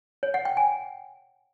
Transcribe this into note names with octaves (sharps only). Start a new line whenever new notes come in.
C#5
F#5
G5
G#5